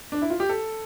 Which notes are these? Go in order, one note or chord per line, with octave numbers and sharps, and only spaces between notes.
D4
E4
F4
G4
A4